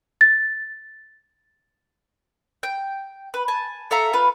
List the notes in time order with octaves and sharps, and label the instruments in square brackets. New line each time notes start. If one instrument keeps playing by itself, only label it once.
[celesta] A6
[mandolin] G5
B4
G#5 A5
A4 E5 F5 A#5
F4 B4